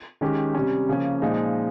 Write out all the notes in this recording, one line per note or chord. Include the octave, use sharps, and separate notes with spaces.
D#3 G#3 C#4 G4
C3 G3 C#4
C#3 F3 A#3 C#4
A#2 F3 G#3 D#4